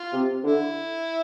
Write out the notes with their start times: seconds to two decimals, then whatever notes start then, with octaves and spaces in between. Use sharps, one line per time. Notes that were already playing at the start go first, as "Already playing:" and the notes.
Already playing: F4
0.13 C3
0.44 D3 E4